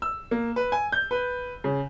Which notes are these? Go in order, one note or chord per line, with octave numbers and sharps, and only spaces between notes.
E6
A#3
B4
G#5
G6
B4
C#3